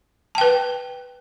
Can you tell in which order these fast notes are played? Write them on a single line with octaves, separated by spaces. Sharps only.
A5 G5 B4